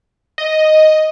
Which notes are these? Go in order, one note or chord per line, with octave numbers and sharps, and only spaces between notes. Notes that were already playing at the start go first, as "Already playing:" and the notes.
D#5